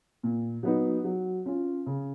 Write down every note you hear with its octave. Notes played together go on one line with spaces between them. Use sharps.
A#2
F#3 B3 D#4
F#3
C#4 F4
C#3